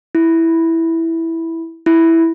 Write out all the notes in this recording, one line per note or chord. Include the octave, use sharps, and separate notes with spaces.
E4
E4